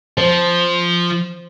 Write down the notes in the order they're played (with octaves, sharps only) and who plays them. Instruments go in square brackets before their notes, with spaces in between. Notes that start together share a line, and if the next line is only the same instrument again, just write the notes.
[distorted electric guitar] F3 [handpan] C5